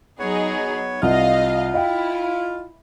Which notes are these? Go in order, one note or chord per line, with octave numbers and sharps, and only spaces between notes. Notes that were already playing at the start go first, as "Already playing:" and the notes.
F#3 B3 D#4 G#4 C#5
C2 F4 D#5 F5
E4 D#5 F5 G5